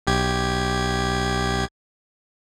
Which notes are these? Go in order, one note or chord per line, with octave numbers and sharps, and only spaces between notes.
B1 G4 G#6